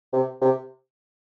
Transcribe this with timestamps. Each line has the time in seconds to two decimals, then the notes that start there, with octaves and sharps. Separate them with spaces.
0.13 C3
0.41 C3